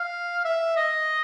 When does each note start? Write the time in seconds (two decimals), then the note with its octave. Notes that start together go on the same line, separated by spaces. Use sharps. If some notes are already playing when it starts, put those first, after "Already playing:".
Already playing: F5
0.45 E5
0.76 D#5